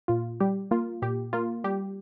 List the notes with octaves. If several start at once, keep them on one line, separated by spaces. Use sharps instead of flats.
A#2 F4
G3 G4
A#3 F4
A#2 G4
A#3 F4
G3 G4